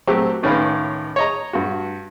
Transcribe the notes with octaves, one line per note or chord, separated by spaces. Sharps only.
C2 F#3 A3 C4 G4
C#2 A2 D#3 C#4 B4 F5
C#5 D#5 A#5
G2 F#4